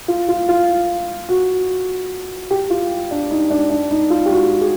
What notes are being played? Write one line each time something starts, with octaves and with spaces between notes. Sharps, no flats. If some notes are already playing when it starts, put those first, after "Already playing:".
F4
F4
F4
F#4
G4
F4
D4
D#4
D4
D4
D#4
F4
G4
F#4
G#4